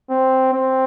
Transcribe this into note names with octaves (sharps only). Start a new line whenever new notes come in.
C4
C4